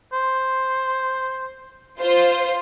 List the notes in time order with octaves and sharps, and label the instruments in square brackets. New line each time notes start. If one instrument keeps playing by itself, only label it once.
[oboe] C5
[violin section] F4 C5